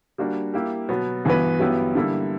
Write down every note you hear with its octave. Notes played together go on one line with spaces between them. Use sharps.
G3 A#3 D4 F#4
A#3 E4 G4
B2 F#3 B3 F#4
G2 E3 B3 F#4 B4
G2 F#3 B3 E4 G4
D3 G3 A#3 E4